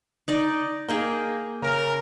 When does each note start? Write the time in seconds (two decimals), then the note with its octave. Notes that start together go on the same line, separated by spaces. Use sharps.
0.28 D#4 D5 D#5
0.88 A#3 G#4 D#5 G5
1.62 C#3 A#4